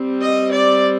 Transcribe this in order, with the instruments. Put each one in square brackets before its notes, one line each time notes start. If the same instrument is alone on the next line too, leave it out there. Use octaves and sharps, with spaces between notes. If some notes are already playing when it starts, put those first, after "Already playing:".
Already playing: [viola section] G3 C4
D#5
D5